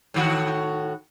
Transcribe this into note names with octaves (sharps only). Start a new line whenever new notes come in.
A2 D#3 F#4